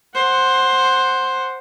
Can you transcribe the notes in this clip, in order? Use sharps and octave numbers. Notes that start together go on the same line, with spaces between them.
C5 F#5